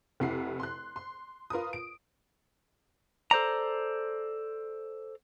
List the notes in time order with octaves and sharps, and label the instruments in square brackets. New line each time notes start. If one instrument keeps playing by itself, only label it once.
[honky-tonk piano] F1 C3 E4 F#5 C7
C6 F#6
C6
F4 A#4 B4 D#6
D7
[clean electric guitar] A4 C5 D5 A#5